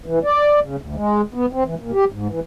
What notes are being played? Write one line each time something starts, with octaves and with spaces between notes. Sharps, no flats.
E3
D5
C#3
D2
G#3
B3
C4
E3
A#2
G4
G#2
E3